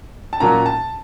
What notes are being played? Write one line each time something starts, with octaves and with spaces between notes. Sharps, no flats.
A5
A#2 F#3 A#3 C#4 A#5
A5